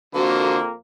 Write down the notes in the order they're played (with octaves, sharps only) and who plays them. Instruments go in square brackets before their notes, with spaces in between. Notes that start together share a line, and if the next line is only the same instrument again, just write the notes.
[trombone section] F2 A#3 [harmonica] D3 C5 [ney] F#4